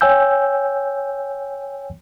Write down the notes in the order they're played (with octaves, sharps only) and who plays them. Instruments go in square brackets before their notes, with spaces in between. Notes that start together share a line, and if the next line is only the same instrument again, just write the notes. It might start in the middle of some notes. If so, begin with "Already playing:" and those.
[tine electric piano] C#5 G5 G#5 E6 G6